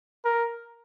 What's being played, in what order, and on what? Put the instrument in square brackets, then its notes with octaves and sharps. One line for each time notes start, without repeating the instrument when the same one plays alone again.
[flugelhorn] A#4